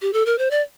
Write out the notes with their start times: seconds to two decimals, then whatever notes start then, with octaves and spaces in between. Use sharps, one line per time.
0.02 G4
0.13 A4
0.26 A#4
0.38 C5
0.50 D5